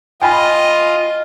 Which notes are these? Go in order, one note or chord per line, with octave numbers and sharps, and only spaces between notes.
F4 D#5 G5 G#5 B5